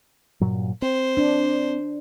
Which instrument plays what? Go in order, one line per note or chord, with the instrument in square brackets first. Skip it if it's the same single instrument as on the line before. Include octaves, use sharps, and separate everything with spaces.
[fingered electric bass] G2 A#2 F#3
[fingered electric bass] C4 [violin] C5
[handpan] D4